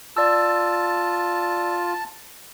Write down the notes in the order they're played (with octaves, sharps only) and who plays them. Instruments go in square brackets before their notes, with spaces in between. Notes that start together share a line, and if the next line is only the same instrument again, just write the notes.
[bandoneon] F4 [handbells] D5 E6 [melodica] A5